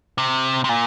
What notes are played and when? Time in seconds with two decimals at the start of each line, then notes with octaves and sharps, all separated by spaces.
0.18 C3
0.64 C3
0.69 A#2